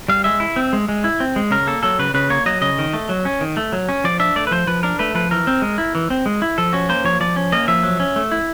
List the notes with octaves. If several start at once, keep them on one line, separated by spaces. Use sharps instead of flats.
G3 F5
G#3 E5
E4
C4
G#3
G#3
E4
C4
G#3
C#3 A#4
A#3 A4
F#3 A4
C#3 B4
C#3 B4
A#3 C#5
F#3 D#5
C#3 D#5
D#3
A3
F#3
C#4
D#3
A3
F#3
C#4
F3 D5
D4 E5
A3 D5
B4
F3 C5
F3 B4
D4 A#4
A3 B4
F3 B4
E3 A#4
C4
G#3
E4
E3
C4
G#3
E4
F3 A4
C#4 F#4
A#3 C5
F3 C#5
F3 D5
C#4
A#3 D#5
F3 E5
F#3
C#4
A3
E4